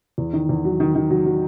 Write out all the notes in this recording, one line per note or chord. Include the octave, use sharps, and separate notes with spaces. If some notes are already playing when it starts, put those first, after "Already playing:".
E2
D#3
E2
F#3
D#3
D#3
F#3
F#3